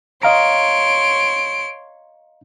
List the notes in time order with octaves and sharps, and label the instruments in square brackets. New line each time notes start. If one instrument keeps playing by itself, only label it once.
[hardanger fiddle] C#5 C6 [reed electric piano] D#5 F5 A#5 [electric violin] D7